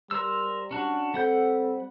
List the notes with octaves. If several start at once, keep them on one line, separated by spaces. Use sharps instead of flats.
G3 A#4 C5 E6
C#4 D4 F#4
G3 C4 A4 F#5 G6